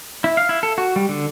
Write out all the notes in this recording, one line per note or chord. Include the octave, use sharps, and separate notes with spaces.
E4
F5
E4
A4
F#4
G3
D3